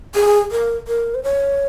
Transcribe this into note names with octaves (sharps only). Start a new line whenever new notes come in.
G#4
A#4
A#4
C5
C#5